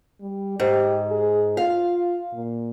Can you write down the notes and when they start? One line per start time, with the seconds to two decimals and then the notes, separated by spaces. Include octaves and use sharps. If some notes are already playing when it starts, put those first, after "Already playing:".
0.21 G3
0.60 G#2 G4
1.11 G#4
1.57 F4 F5
2.33 A#2